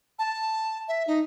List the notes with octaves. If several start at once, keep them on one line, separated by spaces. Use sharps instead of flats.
A5
E5
D#4